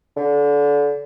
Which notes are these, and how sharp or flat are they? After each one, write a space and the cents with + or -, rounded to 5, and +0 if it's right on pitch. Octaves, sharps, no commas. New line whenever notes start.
D3 -30